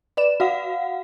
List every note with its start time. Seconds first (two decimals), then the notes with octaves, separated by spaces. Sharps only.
0.17 B4 D5 E7
0.40 F#4 F5 F#5